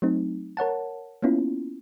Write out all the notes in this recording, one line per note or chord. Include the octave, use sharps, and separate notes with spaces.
F#3 A3 C4 D#4
A#4 C#5 F#5 A5
A#3 B3 C#4 E4 F4